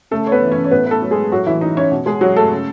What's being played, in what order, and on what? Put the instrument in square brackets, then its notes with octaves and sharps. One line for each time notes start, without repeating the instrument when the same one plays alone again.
[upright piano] C#3 A3 A4
C#5
B3 B4
E3
C#4 C#5
C#5
A2 B3 B4
B4
A3 A4
F#3
G#3 G#4
A2 F#3 F#4
E3 E4
F#3 D#4
C#4 C#5
B2
G#3 G#4
F#3 F#4
A3 A4
C#3